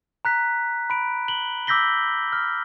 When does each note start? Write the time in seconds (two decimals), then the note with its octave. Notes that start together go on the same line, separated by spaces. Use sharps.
0.25 A#5 F#6 B6
0.90 B5 D7
1.28 F#7 G7
1.67 D6 E6 G6 A#6 B6 G7
2.33 F6